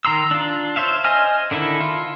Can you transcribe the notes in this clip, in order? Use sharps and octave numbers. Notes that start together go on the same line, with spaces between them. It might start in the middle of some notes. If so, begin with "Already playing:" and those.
D#3 A#5 C6 E6
D4 F4
C5 C#5 E5 F5
C5 D#5 G#5 F6
D3 D#3 E4 A4
F4